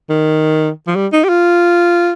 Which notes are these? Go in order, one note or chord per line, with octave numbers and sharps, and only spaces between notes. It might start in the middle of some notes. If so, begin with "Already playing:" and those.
D#3
F3
G3
D#4
G4
F4